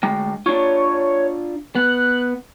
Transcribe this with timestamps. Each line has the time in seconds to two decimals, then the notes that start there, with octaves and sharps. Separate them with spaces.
0.03 D2 G#3 G5
0.46 D4 F4 C#5
1.75 B3 F#6